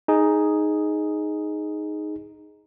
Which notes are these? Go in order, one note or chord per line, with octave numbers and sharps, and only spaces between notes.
D#4 G#4